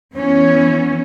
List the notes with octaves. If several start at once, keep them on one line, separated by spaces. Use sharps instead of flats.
E3 B3 C#4